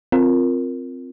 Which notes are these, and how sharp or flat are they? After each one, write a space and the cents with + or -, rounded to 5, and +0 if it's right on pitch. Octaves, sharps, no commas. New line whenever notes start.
C4 +0 F4 +0 A#4 +0